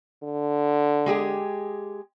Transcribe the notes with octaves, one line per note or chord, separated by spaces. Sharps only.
D3
G#3 G4 G#4